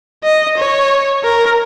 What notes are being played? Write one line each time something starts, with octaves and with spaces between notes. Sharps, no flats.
D#5
C#5
A#4